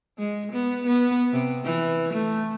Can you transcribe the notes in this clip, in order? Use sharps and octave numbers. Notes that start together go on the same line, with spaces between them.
G#3
B3
B3
C3
E3
A3